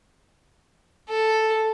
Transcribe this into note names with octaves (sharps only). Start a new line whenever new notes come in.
A4